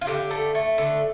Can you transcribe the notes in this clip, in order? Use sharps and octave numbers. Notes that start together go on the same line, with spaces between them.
F4
D3 G4
A3
A3
D3